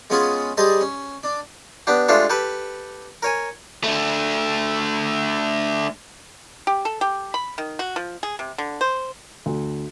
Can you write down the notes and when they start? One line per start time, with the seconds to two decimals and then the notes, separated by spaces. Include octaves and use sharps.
0.10 G#3 B3 C#4 F4 G#4
0.57 G3 G#4 C5 D#5 A5
0.81 C#4
1.23 D4
1.87 B3 D4 G4
2.09 G#3 A3 D4 F4 G4 A4
2.30 G4 A4 B4
3.23 A#4 C#5 G#5
3.83 A3 D4
6.67 G4
6.85 A4
7.01 G4
7.34 B5
7.58 D#3
7.79 F#4
7.96 F3
8.23 G#4
8.39 C3
8.58 D3
8.81 C5
9.46 D2